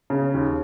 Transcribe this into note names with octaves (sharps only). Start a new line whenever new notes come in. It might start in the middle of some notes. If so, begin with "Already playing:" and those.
C#3
D#2